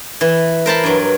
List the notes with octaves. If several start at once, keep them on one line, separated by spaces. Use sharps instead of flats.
E3
A#4 C5 A5 B5
G2 F#3